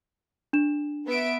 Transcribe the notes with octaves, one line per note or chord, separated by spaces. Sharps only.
D4 E7
B3 E5 D7